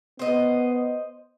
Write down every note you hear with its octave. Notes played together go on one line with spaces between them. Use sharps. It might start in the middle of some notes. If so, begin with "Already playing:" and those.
B3 C5 D#5